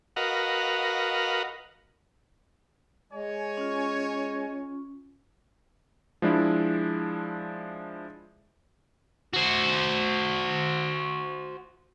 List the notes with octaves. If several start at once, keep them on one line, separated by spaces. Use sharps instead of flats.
F#4 A#4 B4 D#5 F5 F#5
G#3 C#5 G#5
C#4 F4
F3 G#3 D4 E4
F#4 C5